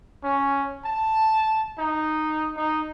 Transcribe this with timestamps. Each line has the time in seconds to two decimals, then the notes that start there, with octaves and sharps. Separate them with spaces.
0.24 C#4
0.85 A5
1.78 D#4
2.57 D#4